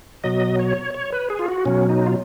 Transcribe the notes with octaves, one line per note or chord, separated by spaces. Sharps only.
B2 F#3 D#5
C#5
C#5
B4
G#4
F4
F#4
B2 F#3 C#4
D#4
F4